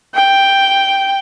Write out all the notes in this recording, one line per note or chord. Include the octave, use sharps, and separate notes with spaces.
G5